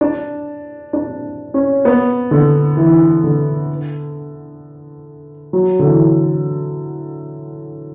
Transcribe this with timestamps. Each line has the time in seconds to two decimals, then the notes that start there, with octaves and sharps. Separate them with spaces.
0.01 D4
0.93 D4
1.54 C#4
1.85 B3
2.31 D3
2.77 E3
3.24 D3
5.53 F#3
5.79 D3
5.84 E3